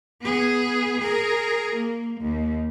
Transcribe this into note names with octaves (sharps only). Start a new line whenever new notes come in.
B3 G#4
G#4 A#4
A#3
D#2